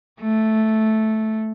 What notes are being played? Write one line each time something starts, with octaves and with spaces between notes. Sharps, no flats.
A3